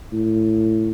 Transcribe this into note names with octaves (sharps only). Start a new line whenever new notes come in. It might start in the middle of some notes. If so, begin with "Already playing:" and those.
A2